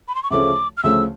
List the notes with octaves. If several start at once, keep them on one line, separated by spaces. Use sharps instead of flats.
B5
C6
C#6
D2 C#3 F3 A3 C#4 D6
F6
D2 C#3 F3 A3 C#4 E6